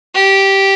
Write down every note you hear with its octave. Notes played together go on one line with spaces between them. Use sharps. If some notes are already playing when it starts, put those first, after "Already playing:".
G4